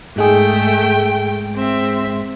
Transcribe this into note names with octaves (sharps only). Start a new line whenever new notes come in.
G#2 G#3 A3 G#4 G5
C4 E5